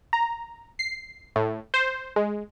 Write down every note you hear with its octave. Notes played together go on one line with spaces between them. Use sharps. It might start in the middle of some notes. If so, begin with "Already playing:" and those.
A#5
C7
A2
C5
G#3